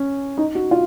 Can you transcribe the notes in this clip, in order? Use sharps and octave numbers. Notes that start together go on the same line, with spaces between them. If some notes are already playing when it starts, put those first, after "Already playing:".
Already playing: C#4
D#4
F#4
F4